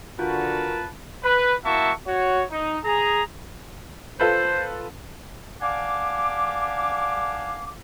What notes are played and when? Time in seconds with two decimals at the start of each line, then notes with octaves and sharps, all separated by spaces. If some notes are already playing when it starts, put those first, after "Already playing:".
0.19 D3 F4 F#4 A#4 B4 A5
1.23 B4
1.65 A#3 E4 F#4 E5 A5 C#6
2.06 F#4 C#5
2.51 D#4
2.84 G#4 A#5
4.20 F4 A4 B4 C5
5.61 D5 F5 F#5 G#5 A5 D6